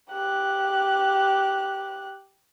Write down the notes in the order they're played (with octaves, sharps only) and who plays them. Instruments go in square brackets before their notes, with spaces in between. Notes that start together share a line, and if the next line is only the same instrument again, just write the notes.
[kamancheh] G4 F#6